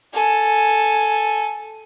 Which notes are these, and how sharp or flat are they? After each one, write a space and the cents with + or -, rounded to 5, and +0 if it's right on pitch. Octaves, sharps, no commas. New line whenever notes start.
A4 +0 G#5 +5